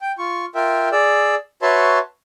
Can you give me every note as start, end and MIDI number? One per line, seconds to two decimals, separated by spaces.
0.01 0.12 79
0.18 0.45 65
0.18 0.45 85
0.55 0.89 65
0.55 0.89 70
0.55 0.89 76
0.55 0.89 79
0.92 1.35 68
0.92 1.35 74
0.92 1.35 88
1.62 1.99 66
1.62 1.99 71
1.62 1.99 73
1.62 1.99 76
1.62 1.99 81
1.62 1.99 84